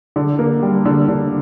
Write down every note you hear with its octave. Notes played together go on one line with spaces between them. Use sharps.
D3
A#3
G3
D3
D3